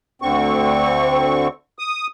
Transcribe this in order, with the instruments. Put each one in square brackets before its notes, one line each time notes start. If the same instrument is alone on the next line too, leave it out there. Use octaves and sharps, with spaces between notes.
[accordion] D2 D3 C4 C#6
D#6